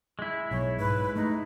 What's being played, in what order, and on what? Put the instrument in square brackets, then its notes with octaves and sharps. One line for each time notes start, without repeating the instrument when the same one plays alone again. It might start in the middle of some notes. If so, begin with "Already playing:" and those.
[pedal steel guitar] G#3 E4
[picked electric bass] B1 [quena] C#5
[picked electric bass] G#2 [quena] B4
[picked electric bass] A3 [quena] D#4